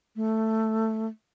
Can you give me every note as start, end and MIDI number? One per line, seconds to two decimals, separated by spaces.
0.16 1.07 57